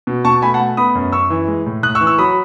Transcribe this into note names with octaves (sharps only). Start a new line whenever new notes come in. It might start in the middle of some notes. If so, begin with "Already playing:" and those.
B2
B2 A5 C#6
A3 G#5 B5
F#5 A5
A3
B3 B5 D#6
F#2
F#2 C#6 E6
E3
G#3
A2
A2 D#6 F#6
C#6 E6
E3
C#6 E6
F#3 B5 D#6